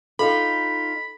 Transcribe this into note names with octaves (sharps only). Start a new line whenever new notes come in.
D#4 F4 A4 D#5 G5 B5